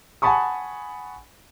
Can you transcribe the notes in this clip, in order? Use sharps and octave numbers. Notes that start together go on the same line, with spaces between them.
F#5 G#5 A5 B5 C#6 D#6